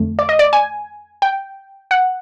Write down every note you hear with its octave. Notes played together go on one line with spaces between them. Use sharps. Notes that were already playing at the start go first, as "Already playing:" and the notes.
Already playing: F2 D3 A3
D5
D#5
D5
G#5
G5
F#5